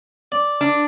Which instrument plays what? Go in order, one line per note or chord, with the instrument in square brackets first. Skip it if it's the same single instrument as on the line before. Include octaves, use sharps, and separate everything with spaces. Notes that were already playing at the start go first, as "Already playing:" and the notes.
[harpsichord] D5
[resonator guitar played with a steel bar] D4